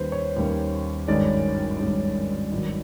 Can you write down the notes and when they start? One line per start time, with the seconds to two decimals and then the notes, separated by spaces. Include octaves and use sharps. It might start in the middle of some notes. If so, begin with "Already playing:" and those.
Already playing: D#2 D#3 G3 A#3 C#4 B4 C5
0.12 C#5
0.36 D#2 D#3 G3 A#3 C#4
1.08 G#1 G2 D#3 G#3 C#4 D5
1.79 G#1 G2 D#3 G#3 C#4
2.51 G#1 G2 D#3 F#3